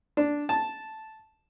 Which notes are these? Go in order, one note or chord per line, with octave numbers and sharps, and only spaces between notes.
D4
A5